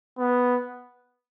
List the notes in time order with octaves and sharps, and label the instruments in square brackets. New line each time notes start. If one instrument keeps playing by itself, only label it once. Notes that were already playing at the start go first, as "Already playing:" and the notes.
[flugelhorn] B3